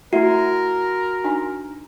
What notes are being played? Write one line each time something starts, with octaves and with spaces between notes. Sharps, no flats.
A3 E4 F#4 A#4 E5
D4 D#4 G#5